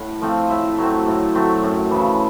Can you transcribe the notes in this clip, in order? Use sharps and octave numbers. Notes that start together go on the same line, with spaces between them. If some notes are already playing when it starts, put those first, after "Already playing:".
Already playing: A2 F#5
F3 A3 C4
A2 E5
F#3 A3 C4
A2
F#3 A3 C4
F#2
C#3 E3